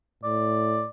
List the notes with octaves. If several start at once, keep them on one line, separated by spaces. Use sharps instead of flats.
A2 D5